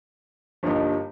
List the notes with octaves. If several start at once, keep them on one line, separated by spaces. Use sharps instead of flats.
G1 G2 F3 A#3 D#4